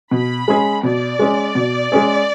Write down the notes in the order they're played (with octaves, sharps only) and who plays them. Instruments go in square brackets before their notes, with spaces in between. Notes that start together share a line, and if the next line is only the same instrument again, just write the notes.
[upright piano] B2 [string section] B5
[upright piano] G#3 C#4 G#4
[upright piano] B2 [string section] D5
[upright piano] G#3 C#4 G#4
B2
G#3 C#4 G#4